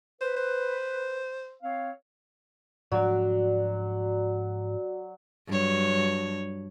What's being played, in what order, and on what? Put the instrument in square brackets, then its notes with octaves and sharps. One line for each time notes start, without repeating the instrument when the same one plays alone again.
[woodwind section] B4 [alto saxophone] C5
[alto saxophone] C5
[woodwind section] C4 C#5 F5
[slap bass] G#2 F3 D4 [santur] F#3 [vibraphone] F#4 D5
[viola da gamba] G2 F#3 C#5